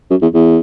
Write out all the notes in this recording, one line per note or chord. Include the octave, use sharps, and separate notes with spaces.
F#2
E2
E2